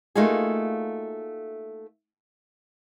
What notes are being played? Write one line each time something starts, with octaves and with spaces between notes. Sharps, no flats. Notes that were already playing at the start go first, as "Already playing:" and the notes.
A3 A#3 D#4 F4 F#4 G#4